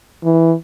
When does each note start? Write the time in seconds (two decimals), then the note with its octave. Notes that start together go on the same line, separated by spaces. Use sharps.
0.24 E3